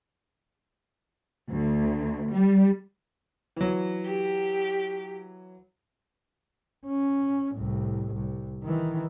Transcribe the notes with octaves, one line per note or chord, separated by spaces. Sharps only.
D2
G3
E3 F#3
G4
C#4
C2 A2
C2
D#3 E3